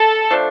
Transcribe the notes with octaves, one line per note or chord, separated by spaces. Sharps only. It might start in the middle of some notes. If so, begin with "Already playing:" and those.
Already playing: A4
F3 A3 D4